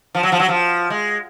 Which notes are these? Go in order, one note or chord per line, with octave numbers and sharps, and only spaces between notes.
F3
F#3
F3
F#3
F3
G#3